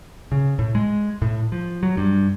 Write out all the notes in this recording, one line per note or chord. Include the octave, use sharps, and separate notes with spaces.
C#3
A2
G#3
A2
F3
F#3
G2